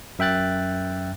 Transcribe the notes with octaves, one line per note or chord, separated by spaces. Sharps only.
F#2 E5 G5 F#6 A6